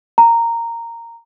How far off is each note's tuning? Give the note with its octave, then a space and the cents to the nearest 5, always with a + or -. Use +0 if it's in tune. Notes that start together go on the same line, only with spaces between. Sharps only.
A#5 -10